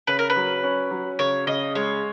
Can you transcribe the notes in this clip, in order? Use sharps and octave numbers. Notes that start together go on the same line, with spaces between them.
C#3 B4
A#4
B4
F#3
C#4
F#3
C#3 C#5
C#3 D#5
G#3 C#5